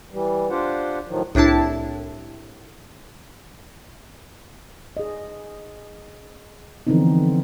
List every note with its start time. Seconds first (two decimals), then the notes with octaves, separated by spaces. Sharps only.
0.12 E3 G3
0.50 D4 F4 G4 C5 F#5
1.08 A2 D#3 F3 F#3
1.35 C2 A2 D4 E4 A5
4.97 G#4 D#5
6.87 D3 E3 F3 B3 C4 D#4